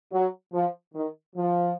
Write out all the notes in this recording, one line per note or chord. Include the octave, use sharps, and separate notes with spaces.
F#3
F3
D#3
F3